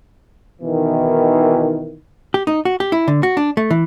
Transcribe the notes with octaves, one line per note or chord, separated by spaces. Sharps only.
B2 D#3 E3
G4
D#4
F#4
G4
E4
D3
F#4
D4
A3
E3